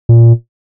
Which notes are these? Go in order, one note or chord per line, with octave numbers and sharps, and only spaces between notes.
A#2